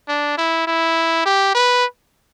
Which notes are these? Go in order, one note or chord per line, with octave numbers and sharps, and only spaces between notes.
D4
E4
E4
G4
B4